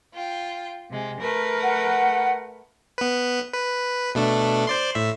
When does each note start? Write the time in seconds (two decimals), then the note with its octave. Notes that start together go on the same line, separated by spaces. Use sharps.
0.13 F4 G5
0.90 C3 G#3
1.21 A3 A#4 B4
1.62 F#5
2.98 B3 B4
3.53 B4
4.15 B2 A3 D4
4.67 C5 D5 C6
4.95 A2 E5